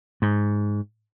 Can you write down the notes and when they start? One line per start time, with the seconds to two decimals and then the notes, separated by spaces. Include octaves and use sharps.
0.22 G#2